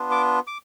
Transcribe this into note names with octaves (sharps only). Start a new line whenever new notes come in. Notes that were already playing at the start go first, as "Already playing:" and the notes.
Already playing: B3 D4 F4
D6
D6